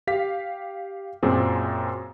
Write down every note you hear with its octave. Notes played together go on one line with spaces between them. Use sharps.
G4 F5 B6
F#2 A#2 C4 G#4